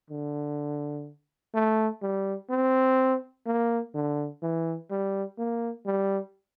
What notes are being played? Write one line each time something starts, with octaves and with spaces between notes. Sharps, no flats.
D3
A3
G3
C4
A#3
D3
E3
G3
A#3
G3